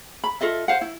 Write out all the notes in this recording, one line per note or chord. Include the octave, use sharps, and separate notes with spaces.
B5
F4 A4 D#5 E5
C5 F5 F#5
E4